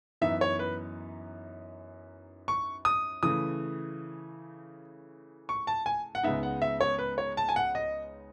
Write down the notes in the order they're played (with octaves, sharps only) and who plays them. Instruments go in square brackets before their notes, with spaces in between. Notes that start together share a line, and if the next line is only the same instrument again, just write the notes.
[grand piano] F#2 E3 B3 D#4 E5
C#5
B4
C#6
D#6
C#3 E3 A3 D#6
C#6
A5
G#5
F#5
C#2 C#3 G#3 B3 D#4 E5
F#5
E5
C#5
B4
C#5
A5
G#5
F#5
D#5